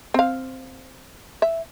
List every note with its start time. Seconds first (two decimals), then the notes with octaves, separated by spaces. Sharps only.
0.14 C4 F5
1.42 E5